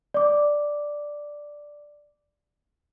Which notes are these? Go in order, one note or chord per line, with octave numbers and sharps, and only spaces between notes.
D5 D6